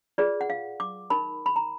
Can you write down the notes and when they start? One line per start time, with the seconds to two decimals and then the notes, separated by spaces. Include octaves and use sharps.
0.18 F4 G#4 B4 D5
0.41 F#5
0.50 F5
0.80 D6
1.10 D#4 A#4 B5
1.46 B5
1.56 A#5